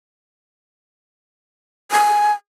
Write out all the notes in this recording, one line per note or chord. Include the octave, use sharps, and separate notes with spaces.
G#5